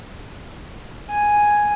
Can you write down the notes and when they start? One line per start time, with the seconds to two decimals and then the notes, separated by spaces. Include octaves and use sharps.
1.10 G#5